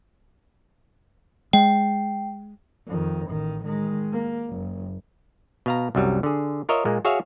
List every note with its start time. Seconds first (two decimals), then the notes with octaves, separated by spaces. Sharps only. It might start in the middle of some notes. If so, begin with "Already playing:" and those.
1.53 G#3 G5
2.87 F2 D#3
3.28 A1 D#3
3.65 D#3 G#3
4.13 A#3
4.49 F#1
5.66 B2 F5 A#5
5.95 C2 F#2 F#3 G3
6.23 D3 G#4
6.69 F4 A#4 C#5 D#5 E5
6.85 A#2 G#3 A#3
7.05 F#4 G#4 C#5 E5 F5